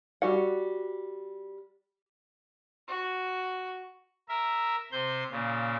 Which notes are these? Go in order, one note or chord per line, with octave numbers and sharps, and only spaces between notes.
G3 F#4 F#5
F#4
A#4 E5
C3 C5 G6
A#2 C#3